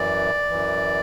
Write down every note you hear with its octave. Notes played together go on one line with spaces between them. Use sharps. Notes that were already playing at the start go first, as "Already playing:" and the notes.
Already playing: F#2 E3 D5
F#2 E3